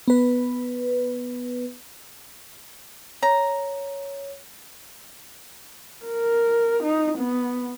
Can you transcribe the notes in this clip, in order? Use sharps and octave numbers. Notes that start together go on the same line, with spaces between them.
B3 B4
C#5 A#5
A#4
D#4
B3